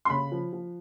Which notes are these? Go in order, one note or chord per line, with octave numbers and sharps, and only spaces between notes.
C6
C#3 B5
F3
F3